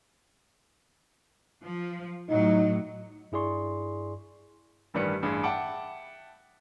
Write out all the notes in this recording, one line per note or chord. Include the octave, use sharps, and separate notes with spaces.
F3
A2 F#3 D#4
G2 E4 G#4 D5 C6 C#6
A1 G2 D#3 G3 B4 C#7
A1 G2 G#4 B5
E5 F#5 G5 A5 D6 D7